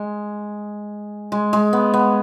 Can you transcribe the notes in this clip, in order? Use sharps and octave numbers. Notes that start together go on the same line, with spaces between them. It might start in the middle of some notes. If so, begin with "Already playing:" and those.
Already playing: G#3
G#3
G#3
B3
B3